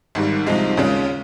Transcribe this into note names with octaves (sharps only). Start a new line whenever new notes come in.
G#1 G#2 D#3 G3
C2 C3 F3 G#3 D#4
D#2 C#3 G#3 C#4 F4